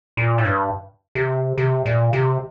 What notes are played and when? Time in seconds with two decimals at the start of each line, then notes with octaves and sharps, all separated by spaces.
0.17 A#2
0.38 A2
0.45 G2
1.15 C3
1.58 C3
1.86 A#2
2.13 C3